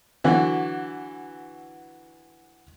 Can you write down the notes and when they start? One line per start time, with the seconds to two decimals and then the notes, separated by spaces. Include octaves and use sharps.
0.24 D3 E3 F#3 F#4